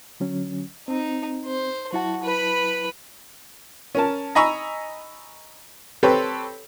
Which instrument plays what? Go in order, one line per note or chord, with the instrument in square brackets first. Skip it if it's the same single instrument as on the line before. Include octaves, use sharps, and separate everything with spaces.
[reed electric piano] D3 F#3 C#4
[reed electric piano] C4 [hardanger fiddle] D#4
[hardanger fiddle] C5
[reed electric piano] F#3 E4 A5 [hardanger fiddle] F#4
[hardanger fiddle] B4 B5
[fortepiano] C#4 A#4 A5
D#5 G#5 A#5 B5 C#6 E6
C4 G4 A4 B4 C#5